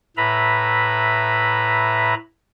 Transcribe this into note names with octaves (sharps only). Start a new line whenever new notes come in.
A2 B4 E5 A#5 B5